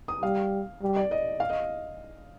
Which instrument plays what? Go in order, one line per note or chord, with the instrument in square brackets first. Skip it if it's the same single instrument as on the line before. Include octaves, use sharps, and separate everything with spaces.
[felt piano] D#6
[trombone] G3 [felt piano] F5
[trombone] G3
[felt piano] D5
D#5
F5
D#5